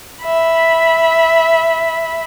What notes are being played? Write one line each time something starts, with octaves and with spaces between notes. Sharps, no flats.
E5 B5